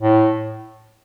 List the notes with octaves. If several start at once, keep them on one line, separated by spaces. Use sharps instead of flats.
A2